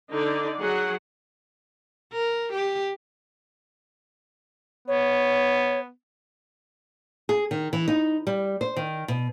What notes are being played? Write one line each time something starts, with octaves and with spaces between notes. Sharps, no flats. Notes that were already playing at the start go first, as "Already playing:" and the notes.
D3 D#4 D5
F#3 G#4 F#5
A#4
G4
B3 C#5
G#4
D#3
E3
D#4
G3
C5
D#3
B2